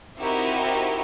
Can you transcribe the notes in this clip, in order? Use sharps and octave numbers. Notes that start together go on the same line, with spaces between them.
C4 D#4 E4 F#4 G4 A#4